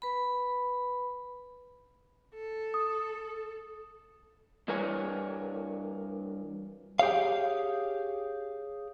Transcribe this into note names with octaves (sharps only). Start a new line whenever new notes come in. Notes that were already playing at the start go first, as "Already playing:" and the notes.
B4 B5
A4
D#6
G2 E3 A#4 C#5 G#5
G4 G#4 C#5 F5